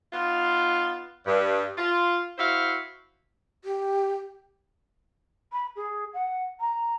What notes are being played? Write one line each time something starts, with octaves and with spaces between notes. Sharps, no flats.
B3 D#4 F4
G2
F4
E4 F#4 C5 E5 F5
G4
B5
G#4
F#5
A#5